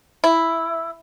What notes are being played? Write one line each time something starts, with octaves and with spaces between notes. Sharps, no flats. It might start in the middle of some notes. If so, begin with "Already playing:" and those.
E4